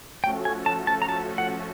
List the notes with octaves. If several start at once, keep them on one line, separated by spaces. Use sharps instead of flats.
F3 A3 C#4 F#4 A4 G5
G#5
A5
A5
A#5
A5
F#5